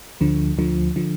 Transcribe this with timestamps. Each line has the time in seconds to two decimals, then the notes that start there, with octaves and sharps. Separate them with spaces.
0.21 D2 D3 F3
0.58 D2 D3 F3
0.96 D3 F3